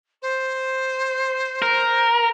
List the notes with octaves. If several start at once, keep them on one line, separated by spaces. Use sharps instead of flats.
C5
A#4